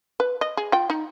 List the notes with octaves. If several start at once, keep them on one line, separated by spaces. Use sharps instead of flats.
B4
D#5
G#4
F4 G5
D#4